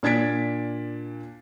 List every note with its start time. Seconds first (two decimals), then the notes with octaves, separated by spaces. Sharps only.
0.03 A#2 D4 G#6 A6 B6 D7